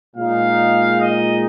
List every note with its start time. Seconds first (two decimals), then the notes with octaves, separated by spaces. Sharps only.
0.16 A#2 G#3 D#4 F5
1.01 D#5